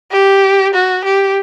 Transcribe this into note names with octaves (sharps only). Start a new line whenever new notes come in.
G4
F#4
G4